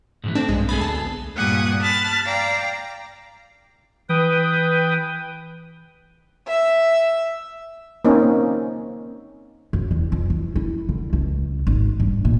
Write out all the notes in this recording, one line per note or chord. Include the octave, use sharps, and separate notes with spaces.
G#2 D3 E3
A3 C4 D4
B1 G2 G#3
B3 G#4 A4 B5
D2 A5
G2 A#2 G3 F#5 G#5 D#6
A5 B5 F6 F#6 A6
D5 F5 G5 A#5
E3 B4 G5 D#6
E5
A#3 C4 C#4 D#4
F#2
E2
F2
E3
E4
D3
C#2
G#1
G2
A#2